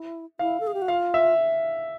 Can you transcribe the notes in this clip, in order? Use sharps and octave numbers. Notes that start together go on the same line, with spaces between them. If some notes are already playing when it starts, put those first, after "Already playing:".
Already playing: E4
E4 F5
A4
G#4
G4
F#4
F4 F5
E5